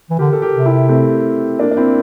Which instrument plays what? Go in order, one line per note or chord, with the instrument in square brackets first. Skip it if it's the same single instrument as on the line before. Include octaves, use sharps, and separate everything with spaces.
[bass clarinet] E3
[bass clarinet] D3 [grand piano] G4 A#4
[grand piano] A4
G4 A#4
[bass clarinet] C3
[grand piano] E4 G4
A3 C4
A#3 D4
D4
C4 E4